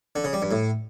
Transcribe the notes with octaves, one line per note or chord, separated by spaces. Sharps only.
D3
C#3
G3
G2
A2